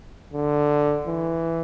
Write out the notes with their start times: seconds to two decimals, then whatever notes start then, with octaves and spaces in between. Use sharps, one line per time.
0.33 D3
1.08 E3